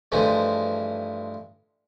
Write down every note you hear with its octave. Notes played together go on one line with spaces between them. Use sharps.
G2 E3 F3 G#3 A3